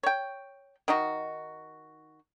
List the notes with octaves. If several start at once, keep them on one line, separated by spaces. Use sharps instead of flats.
C#5 G5
D#3 D#4 F#4